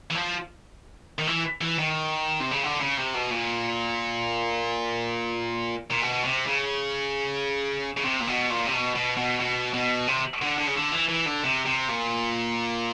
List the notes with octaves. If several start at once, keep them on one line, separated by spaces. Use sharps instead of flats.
E3
F3
D#3
E3
E3
D#3
C3
C#3
D3
C#3
C3
B2
A#2
A#2
B2
C3
C#3
C#3
C3
A#2
B2
A#2
C3
B2
B2
B2
B2
B2
C3
D3
D3
C#3
D3
E3
E3
D3
C3
C3
A#2